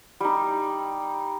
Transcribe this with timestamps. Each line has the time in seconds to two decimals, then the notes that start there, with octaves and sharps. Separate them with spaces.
0.20 G3 D#4